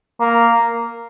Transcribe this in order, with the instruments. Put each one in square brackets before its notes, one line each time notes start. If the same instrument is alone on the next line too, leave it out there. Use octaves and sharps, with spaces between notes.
[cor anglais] A#3